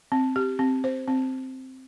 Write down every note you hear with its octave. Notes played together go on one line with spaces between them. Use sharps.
C4
G4
C4
C5
C4